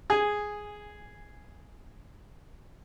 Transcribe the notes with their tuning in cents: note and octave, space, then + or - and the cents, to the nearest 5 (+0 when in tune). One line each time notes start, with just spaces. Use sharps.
G#4 +0 G#5 -15